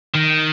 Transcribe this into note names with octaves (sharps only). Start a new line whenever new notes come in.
D#3